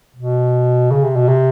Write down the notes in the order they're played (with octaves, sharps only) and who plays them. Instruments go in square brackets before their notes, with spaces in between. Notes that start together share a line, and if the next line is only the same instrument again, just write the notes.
[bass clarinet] B2
C#3
C3
B2
C3